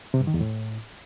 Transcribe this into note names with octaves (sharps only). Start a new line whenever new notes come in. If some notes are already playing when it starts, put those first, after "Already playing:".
C3
G2
D#3
E2
A2